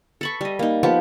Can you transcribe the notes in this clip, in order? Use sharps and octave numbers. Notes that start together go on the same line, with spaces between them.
A4 B5 C#6
G3 D#5
A#3 D#4
F3 B3 F4 G4